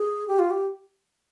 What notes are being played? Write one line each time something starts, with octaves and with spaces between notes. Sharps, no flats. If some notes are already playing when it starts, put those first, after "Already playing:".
Already playing: G#4
G4
F4
G4